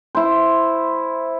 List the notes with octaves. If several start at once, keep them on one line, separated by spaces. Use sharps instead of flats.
E4 C5